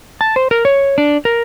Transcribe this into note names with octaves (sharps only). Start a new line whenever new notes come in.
A5
C5
A#4
C#5
D4
A#4